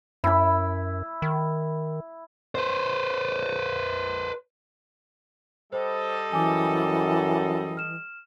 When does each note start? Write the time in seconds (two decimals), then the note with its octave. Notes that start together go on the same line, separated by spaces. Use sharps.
0.24 F#2 E4 B5
1.22 D#3
2.55 B4 C5
5.73 G3 A4 C5 D#5
6.33 F#2 E3 G#5 D6
7.77 F6 E7